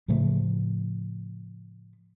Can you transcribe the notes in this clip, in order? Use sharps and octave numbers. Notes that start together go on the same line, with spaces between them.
A2 C#3 F3 A3